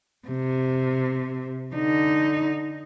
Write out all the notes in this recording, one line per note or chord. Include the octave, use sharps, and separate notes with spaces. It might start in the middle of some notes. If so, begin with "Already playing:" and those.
C3
D3 D#4